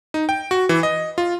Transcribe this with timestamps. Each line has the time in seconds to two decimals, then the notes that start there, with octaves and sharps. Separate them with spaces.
0.14 D#4
0.29 G5
0.51 F#4
0.69 E3
0.83 D#5
1.18 F4